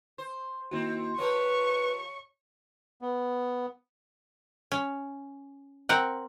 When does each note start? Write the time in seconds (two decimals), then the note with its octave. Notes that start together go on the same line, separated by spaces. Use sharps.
0.18 C5
0.71 D#3 A#3 C4 E4 F#4
1.19 F3 G4 A#4 B4 C#5 C#6
3.01 B3
4.72 C#4
5.89 C4 A#4 F#5